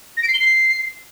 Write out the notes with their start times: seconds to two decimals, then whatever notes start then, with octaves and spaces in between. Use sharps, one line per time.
0.17 A#6
0.23 D7
0.28 C7
0.34 G7
0.39 C7